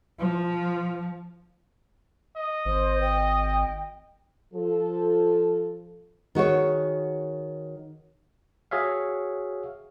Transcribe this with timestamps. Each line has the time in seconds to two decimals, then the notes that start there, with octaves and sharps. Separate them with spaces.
0.20 F3
2.37 D#5
2.66 G#1 C5
3.01 G5
4.53 F3 A4
6.35 D#3 F#4 G#4 C#5
8.71 F#4 G#4 C#5 E5 F5